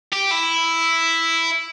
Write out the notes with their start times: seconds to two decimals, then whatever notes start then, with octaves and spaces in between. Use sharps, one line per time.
0.13 G4
0.32 E4